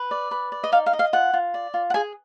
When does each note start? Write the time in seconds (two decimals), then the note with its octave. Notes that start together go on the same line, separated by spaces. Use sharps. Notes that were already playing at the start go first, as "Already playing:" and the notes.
Already playing: B4
0.11 D5
0.31 B4
0.52 D5
0.64 D#5
0.72 D#4 F5
0.86 F5
0.93 D#5
0.99 F5
1.13 F4 F#5
1.33 F4
1.54 D5
1.74 F4
1.90 F#5
1.94 G#4 G#5